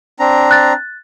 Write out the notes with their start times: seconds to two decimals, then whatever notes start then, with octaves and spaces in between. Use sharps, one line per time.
0.20 C4 D4 A#5
0.51 F#6 A6